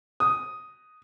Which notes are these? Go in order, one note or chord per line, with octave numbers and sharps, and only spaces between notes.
D#6